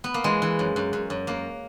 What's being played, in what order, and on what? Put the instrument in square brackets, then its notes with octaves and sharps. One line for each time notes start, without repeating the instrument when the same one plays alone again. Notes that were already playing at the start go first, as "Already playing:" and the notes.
[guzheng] B3
A#3
E3 G#3
E3
F#2
F#2
F#2
F#2
F#2 A#3